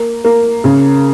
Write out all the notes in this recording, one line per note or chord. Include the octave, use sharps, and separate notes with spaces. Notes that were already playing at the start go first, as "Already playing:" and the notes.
Already playing: A#3
A#3
C#3